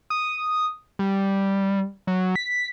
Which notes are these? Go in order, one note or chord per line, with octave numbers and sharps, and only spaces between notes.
D#6
G3
F#3
B6